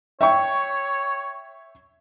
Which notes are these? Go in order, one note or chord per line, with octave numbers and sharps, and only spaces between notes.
C#5 E5 G5 C#6